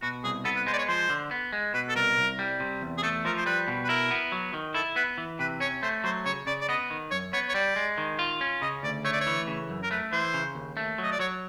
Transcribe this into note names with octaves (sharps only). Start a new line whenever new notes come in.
B2 F#4
C2 G#4
B3 A4
B4
G#3 C5
D5
C#5
F3 C5
D3
B3
G#3
B2 B4
A4
C2 A#4
C2
G3
C3
E2
G#4
A3 A4
F3 A#4
C5
G3 B4
B2
B4
E4 A#4
B3
F#3
D#3
E4 A4
B3 B4
E3
C3 B4
C#4 C#5
A3 C5
F#3 C5
C#3 C#5
C#3 D5
D5
B3 D#5
D#3
F#2 C#5
B3 C#5
C#5
G3 D5
G#3
D#3
F4
C#4
C#3 D#5
D2 D5
A3 C#5
D5
C#5
E3
C#3
F#2
A#4
A3 B4
E3 C5
C#3
D#2
A3
F#3 D#5
D5
F#3 C#5